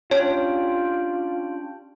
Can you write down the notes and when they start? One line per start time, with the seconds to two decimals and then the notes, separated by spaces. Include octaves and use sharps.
0.11 C#4 D4 F4 G4 C#5